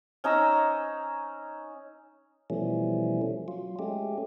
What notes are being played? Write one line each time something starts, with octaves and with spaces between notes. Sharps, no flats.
C#4 D#4 A#5 E6
B2 E3 F3 G3 A3 C#4
F#3 F4
G#3 A3 C#4 G4